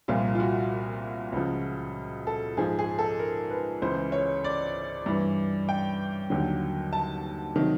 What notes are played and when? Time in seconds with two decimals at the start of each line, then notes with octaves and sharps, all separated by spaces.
0.08 C2 A#2 F3 F4
0.35 F4
0.40 F#4
1.32 C#2 C#3 F3
2.27 A4
2.57 G#2 F3 G#4
2.79 G#4
2.99 A4
3.19 A#4
3.50 B4
3.82 C#2 C#3 E3 C5
4.12 C#5
4.44 D5
5.06 G2 E3
5.69 G5
6.30 D#2 D3 F#3
6.93 A5
7.55 C3 D#3 F#3